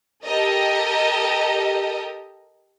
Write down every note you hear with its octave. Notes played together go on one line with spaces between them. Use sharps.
G4 A4 A#4 D#5